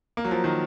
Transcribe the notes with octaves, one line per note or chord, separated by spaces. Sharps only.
A#3
F#3
F3
D#3